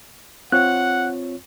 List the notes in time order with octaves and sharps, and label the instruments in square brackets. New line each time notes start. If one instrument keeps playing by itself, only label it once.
[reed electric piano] C4 F4 C#5 [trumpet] F#5 [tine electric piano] F#6